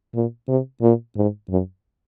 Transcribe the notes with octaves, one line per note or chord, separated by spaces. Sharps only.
A#2
C3
A#2
G#2
F#2